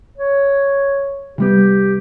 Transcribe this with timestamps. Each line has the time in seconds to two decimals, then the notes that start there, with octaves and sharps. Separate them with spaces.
0.17 C#5
1.38 C3 G3 B3 G4